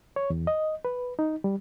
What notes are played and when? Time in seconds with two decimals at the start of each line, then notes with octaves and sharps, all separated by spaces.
0.16 C#5
0.30 E2
0.47 D#5
0.85 B4
1.19 D#4
1.44 G3